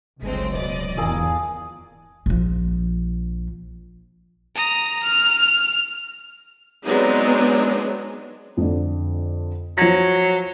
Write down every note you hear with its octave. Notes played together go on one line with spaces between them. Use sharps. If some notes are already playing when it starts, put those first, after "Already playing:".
G1 C#2 F#3 G#3 A3 C4
D1 B2 D5 D#5
G#1 E2 A#2 E3 G#4 A4
A#1 F3
A#5 D#6
F6
F#3 G#3 B3 C4 D4 D#4
F2 D3
F3 F#3 A#6